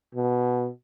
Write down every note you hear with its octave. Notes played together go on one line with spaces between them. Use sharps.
B2